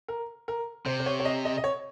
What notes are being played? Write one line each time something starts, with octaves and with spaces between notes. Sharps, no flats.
A#4
A#4
C3 C5
C5
C#5
C#5
D#5
D#5
D#5
C#5